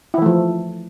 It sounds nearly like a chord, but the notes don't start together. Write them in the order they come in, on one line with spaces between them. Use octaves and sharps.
E4 E3 A3 F3